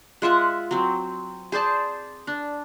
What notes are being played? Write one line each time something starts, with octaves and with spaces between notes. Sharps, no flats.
G#3 F4 E5 F#5
F#3 C4
G#4 C5 D5 A5
D4